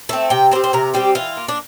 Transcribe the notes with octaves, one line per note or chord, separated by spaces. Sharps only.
A3 C4 E5
C3 G5
G3 C4 C5
C5
C3 A#4
G3 C4 G4
E3 F4
A#3
D4